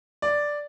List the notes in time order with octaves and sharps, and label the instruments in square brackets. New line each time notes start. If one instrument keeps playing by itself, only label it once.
[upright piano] D5